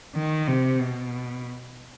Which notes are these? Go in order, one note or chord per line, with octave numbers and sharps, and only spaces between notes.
D#3
C3
B2